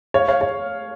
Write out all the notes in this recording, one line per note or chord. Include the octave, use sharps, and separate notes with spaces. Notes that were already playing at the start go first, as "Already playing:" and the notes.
C#5 F5
C#5 F5
C#5